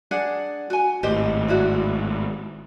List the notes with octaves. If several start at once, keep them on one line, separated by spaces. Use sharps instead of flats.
D4 G#4 F#5
F#4 G#5
G#1 A2 G4 C5 D#5
D4 E4 F#4